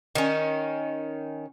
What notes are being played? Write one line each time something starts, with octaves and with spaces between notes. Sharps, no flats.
D#3 C#4